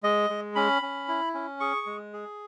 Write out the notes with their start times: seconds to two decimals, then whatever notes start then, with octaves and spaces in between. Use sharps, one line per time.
0.03 G#3 D#5
0.30 G#3
0.55 C#4 B5
0.82 C#4
1.08 E4
1.34 C#4
1.60 G#4 C#6
1.86 G#3
2.13 G#4